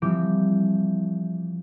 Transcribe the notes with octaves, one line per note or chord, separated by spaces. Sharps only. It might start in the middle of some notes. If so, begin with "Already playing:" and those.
E3 F3 G3 C4 G5 D6